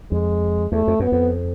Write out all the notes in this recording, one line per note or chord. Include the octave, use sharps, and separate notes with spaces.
F2 G#3
E2 A3
F2
F#2 B3
F2